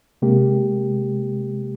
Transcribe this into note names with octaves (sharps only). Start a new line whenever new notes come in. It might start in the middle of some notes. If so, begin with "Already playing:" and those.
C3 G#3 A#3 G4